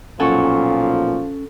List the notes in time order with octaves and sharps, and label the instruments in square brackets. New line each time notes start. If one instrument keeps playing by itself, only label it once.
[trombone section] B1 A#2 [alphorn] F3 [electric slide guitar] C#4 F#5 G#5 [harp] A4 C#6